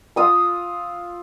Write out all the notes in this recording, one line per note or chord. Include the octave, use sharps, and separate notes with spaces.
F4 D#6 E6